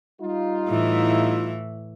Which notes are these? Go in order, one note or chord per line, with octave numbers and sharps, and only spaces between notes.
G3 D#4 F4
A2 E3 E4